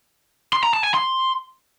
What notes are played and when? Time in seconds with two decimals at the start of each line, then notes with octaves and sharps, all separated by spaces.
0.53 C6
0.63 A#5
0.74 A5
0.84 G#5
0.94 C6